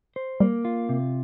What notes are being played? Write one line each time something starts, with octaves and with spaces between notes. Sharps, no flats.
C5
G3 A#3
F4
C3